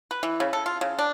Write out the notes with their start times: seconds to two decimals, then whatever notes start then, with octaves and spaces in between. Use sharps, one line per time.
0.11 B4
0.23 E3
0.40 C#3
0.53 A4
0.66 F4
0.81 C#3
0.99 D4